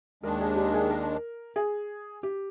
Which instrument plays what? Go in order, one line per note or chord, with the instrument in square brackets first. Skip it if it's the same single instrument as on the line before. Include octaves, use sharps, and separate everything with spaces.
[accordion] D#2 D#3 G#3 D4 [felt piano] A#4
[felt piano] G#4
G4
G#4
A#4
G#4
G4